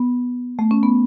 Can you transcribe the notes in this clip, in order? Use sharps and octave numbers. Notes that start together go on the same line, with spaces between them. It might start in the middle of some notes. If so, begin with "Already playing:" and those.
Already playing: B3
A3
C#4
B3